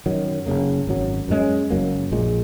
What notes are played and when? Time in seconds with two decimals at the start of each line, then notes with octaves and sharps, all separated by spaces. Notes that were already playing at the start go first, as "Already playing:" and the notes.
0.06 F#2 D#3 F#3
0.46 F#1 F#2 C#3 A#3
0.87 G#1 F#2 F#3
1.28 F#2 C#3 G#3 C#4
1.70 F#1 F#2 F#3 A#3
2.12 A#1 A#2 G#3